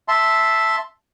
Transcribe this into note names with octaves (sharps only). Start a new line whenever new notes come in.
E5 A5 C6